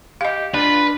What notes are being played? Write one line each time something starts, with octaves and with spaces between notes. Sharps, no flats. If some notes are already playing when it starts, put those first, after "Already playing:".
G4 D#5 F5
D4 F4 B4